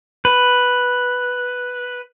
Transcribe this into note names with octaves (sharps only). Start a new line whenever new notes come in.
B4